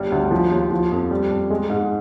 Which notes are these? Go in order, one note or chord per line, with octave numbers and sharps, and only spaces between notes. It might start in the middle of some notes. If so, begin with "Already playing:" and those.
Already playing: G1 G3
D2
F3
D#2
F3
F2
G3
F2
G#3
G#2